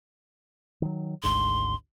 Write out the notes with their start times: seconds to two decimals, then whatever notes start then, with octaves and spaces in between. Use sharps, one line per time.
0.82 D#3 F#3
1.23 G#1 D2 G#2 C6